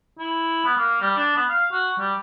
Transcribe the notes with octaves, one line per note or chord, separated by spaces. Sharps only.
E4
B3
A#3
G3
D4
B3
F5
F#4
G3